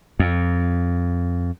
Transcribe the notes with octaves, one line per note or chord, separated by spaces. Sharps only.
F2